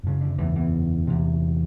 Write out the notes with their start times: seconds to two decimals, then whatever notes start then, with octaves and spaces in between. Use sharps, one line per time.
0.03 F#2 C#3
0.21 D3
0.38 E2 E3
0.55 E2 E3
1.07 E2 C3